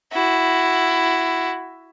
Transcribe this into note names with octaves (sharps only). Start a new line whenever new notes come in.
E4 F#4